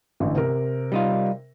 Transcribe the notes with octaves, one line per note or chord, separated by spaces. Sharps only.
A1 D3 E3
C3 A#4
G3 D#4 F4